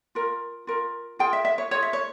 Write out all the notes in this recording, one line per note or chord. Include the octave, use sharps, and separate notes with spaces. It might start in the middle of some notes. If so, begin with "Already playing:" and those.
F4 A#4
F4 A#4
F4 G#4 G5
E5
E5
C#5
F4 G#4 C#5
E5
C#5